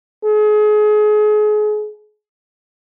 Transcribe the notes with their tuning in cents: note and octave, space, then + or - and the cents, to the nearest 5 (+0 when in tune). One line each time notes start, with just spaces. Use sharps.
G#4 +30